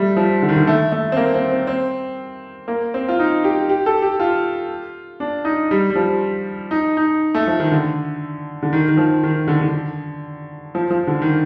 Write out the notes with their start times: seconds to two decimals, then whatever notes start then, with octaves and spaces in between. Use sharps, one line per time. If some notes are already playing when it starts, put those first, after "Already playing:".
Already playing: G3 A3
0.17 F3
0.42 D3
0.49 D#3
0.56 D3
0.67 A3
0.92 A3
1.12 C4
1.17 A#3
1.34 C4
1.51 C4
1.67 C4
2.68 A#3
2.94 C4
3.08 F4
3.19 D#4
3.44 G4
3.70 G4
3.86 A4
4.02 G4
4.20 F4
5.20 D4
5.45 D#4
5.71 G3
5.90 G3
5.96 F3
6.71 D#4
6.97 D#4
7.35 A3
7.47 F3
7.59 D#3
7.72 D3
8.63 D3
8.73 D#3
8.88 D#3
8.97 F3
9.23 D#3
9.48 D3
9.61 D3
10.75 F3
10.91 F3
11.07 D3
11.22 D#3